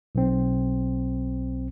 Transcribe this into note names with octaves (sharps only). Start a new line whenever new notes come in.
B1 C4